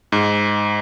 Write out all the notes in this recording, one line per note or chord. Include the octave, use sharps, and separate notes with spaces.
G#2